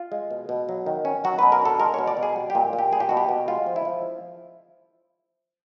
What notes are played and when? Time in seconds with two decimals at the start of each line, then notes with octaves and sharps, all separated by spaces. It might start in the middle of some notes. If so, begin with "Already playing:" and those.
Already playing: F4
0.12 G#3
0.31 B2
0.49 B2
0.69 F#3
0.86 D#3
1.05 C#4
1.24 F#3 F#4
1.39 B2 B4
1.52 A#4
1.62 D4 A4
1.80 G#3 A#4
1.94 B2 C#5
2.07 D5
2.17 B2
2.23 G#4
2.36 G3
2.50 G4
2.55 A#2
2.73 A#2
2.78 G4
2.92 G3 G#4
3.00 G4
3.09 B2 F#4
3.17 G4
3.29 B2
3.48 G#3 F4
3.67 F3
3.76 E4
3.85 F3